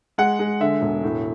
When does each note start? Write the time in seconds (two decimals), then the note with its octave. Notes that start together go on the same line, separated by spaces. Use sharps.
0.18 G#3 F#5
0.39 G#3
0.60 D3 E5
0.82 E1
1.03 A2